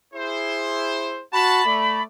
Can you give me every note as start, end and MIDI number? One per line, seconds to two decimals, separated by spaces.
0.14 1.21 64
0.14 1.21 68
0.14 1.21 72
1.33 1.62 66
1.33 1.62 81
1.33 2.02 83
1.65 2.03 57
1.65 2.03 74